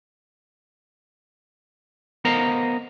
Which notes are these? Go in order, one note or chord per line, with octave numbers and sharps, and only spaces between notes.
B3 A#4 C5 D#5 F5 A#5